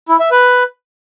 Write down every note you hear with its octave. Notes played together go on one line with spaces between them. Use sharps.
E4
E5
B4